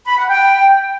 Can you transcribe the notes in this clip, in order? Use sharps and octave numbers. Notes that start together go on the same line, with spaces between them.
B5
F#5
G5